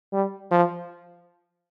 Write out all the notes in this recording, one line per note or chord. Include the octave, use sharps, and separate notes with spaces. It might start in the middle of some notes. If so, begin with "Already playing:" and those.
G3
F3